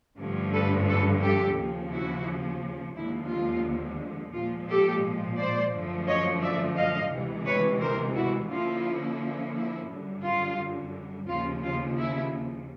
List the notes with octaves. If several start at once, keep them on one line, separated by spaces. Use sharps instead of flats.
G2 D3 F3 A3 C#4
A4 B4
A4 B4
G4 A4
D#2 C#3 F3
E4 F#4
D#2 D3 F3 G#3 E4
F4
A#2 F3 G#3 F4
G4 A4
C5 D5
F#2 D3 F3 A3
C#5 D#5
D5 E5
D#5 F5
D2 C3 E3 G#3
B4 C#5
A#4 C5
E4 F#4
D3 F3 A#3 C#4 E4 F4
E4
F#2 D3 G3
F4
D#2 C#3 F3 F4
F4
E4